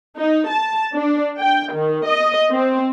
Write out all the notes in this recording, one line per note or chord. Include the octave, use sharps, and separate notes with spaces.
D#4
A5
D4
G5
D#3
D#5
C4